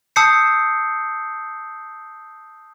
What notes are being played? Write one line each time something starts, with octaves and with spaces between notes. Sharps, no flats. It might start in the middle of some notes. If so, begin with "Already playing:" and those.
A5 D#6 E6 G6 C7 C#7